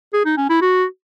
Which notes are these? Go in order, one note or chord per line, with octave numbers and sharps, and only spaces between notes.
G#4
D#4
C#4
E4
F#4